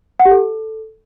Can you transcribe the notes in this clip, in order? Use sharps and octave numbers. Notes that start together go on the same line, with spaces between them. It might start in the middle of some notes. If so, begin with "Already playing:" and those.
F#5
G4
A4